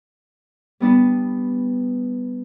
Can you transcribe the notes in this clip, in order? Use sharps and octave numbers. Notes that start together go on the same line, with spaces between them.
G3 B3 D4 B4